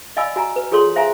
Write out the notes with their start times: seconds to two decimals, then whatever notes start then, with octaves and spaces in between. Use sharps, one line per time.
0.16 D5 D#5 F5 G#5 B5 E6
0.36 F#4 G#5 A#5
0.56 B4
0.72 F4 G#4 A4 C#5 C6
0.96 C5 E5 F5 G#5 A#5